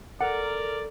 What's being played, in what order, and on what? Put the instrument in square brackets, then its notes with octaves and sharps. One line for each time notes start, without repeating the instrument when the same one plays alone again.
[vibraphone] A4 [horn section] A#4 [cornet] D5 [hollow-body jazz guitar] F#5